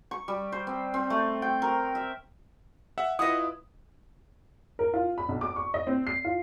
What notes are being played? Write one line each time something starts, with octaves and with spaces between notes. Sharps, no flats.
C#6
G3
C5
C4
C4
A3
G5
A#4
E5
E5 F#5 E6
E4 F4 B4 D#5 F#5 D#6
A#4
F4
B5
B1
D6
C#6
D#5
C4
C7
F4